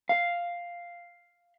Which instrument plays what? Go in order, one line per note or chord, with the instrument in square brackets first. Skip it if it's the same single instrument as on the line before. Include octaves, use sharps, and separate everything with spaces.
[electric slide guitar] F5